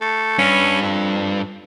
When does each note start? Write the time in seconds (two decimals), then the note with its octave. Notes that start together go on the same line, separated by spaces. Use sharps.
0.01 A3
0.38 G2 C#4
0.81 F2